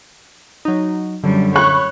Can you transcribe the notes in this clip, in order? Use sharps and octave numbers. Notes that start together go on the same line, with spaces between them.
F#3 D#4
F#2 D3 F#3 G3
C#5 B5 C#6 F#6